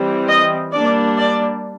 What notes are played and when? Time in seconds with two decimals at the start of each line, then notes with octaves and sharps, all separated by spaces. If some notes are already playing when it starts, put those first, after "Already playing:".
Already playing: E3 G3 C4
0.28 D#5
0.72 G3 A#3 D4 D5
1.17 D5